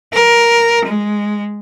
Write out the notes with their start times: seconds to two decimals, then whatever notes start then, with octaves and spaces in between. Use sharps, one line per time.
0.13 A#4
0.86 G#3